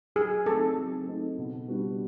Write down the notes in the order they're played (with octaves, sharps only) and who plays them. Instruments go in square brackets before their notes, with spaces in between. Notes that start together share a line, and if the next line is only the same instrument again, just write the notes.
[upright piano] F#3 [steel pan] G#4
[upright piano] A3 C4 D#4 [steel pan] A4
[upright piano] F#3
A3 C4 D#4
B2
G3 B3 D4 F#4